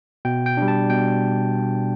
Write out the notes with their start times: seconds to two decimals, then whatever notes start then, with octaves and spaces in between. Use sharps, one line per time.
0.25 B2 G5
0.46 G5
0.57 G3 D4
0.68 A5
0.90 B2 G5